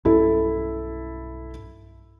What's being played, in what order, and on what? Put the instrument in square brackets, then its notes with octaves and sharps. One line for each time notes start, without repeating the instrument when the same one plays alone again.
[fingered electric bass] B1 G2 C#4 [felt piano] E4 A4